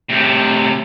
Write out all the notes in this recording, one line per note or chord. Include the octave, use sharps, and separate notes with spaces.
A2 C3